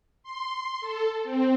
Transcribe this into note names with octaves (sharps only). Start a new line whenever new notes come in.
C6
A4
C4